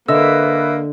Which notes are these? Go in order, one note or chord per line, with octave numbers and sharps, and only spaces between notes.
D3 A#3 A4 B4 D#5 E5 E6